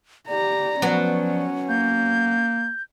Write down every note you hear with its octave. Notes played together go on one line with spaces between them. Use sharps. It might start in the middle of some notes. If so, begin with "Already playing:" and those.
G4 D5 A#5
F3 F#3 B3 C#4
A#3 G6